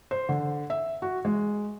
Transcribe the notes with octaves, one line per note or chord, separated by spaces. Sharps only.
C5
D3
E5
F#4
G#3